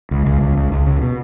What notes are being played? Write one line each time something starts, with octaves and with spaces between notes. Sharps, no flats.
C#2
C#2
C#2
C#2
C#2
C#3
B2